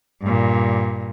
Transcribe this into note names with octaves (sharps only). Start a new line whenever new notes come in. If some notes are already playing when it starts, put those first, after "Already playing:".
G2 A#2